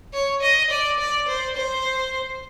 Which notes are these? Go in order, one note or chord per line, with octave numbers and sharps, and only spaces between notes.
C#5
D#5
D5
D5
C5
C5